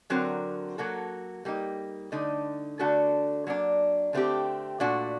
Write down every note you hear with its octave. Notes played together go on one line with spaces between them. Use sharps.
D3 F#3 C4 F#4 A#4
F#3 A#3 F#4 A4
G3 A#3 D#4
D3 A3 D#4
D3 A3 D4 F#4 A4
F#3 A#3 D4
D3 A3 C4 G4
A#2 A3 D4 F#4